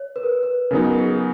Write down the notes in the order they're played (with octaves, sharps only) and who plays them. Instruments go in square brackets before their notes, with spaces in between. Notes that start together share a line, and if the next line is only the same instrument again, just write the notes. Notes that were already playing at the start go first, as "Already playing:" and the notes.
Already playing: [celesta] C#5
B4
A#4
B4
B4
[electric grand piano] C#3 F#3 B3 D#4 [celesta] A#4
[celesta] A#4
G#4